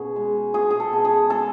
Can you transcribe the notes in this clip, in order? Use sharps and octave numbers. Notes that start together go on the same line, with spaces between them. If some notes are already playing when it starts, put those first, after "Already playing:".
Already playing: B2 C#4 G#4
G#3
B2 G#4
G#4
A4
B2
G#4
G#3 A4